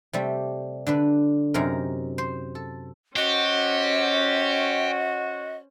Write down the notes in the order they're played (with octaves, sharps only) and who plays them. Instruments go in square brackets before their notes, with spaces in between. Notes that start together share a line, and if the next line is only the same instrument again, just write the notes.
[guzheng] C3 G3 A3
D3 D4 B4
F#2 C3 D#4 A#4
C5
A4
[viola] C#4 C5 [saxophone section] F#4 [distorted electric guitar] G4 [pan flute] D#5